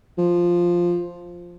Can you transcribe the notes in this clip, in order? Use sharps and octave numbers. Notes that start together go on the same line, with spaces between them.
F3